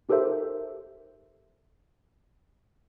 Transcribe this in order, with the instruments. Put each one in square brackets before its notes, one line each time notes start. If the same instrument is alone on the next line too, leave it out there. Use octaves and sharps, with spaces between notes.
[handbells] D#4 G4 A4 A#4 C5 E5